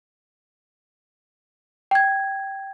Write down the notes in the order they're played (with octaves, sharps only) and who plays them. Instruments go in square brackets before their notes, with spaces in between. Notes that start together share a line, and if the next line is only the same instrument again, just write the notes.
[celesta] G5 G#6